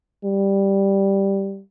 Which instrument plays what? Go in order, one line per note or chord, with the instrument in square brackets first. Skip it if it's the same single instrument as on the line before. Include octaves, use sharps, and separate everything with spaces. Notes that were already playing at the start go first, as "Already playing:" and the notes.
[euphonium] G3